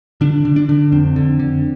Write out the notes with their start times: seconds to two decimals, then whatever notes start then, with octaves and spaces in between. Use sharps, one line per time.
0.21 D3 D4
0.45 D3
0.56 D4
0.69 D3
0.92 F2 C4
1.16 D3
1.40 D3